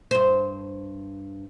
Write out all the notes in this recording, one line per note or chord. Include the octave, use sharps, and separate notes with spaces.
G2 C5